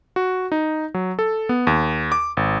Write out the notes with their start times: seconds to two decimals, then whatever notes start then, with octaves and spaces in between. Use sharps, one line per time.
0.16 F#4
0.52 D#4
0.94 F#3
1.19 A4
1.49 B3
1.67 D#2
2.12 D6
2.37 G#1